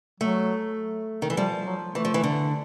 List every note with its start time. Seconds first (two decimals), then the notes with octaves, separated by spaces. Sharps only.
0.20 F#3 A3
1.22 D#3
1.30 E3
1.37 F3 G3
1.66 F#3
1.95 E3 A3
2.05 F3
2.14 E3
2.24 D3